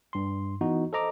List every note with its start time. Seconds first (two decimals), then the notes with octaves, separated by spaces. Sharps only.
0.13 G2 C6
0.61 E3 B3 D#4 F#4
0.93 A4 C5 D#5 A#5 D6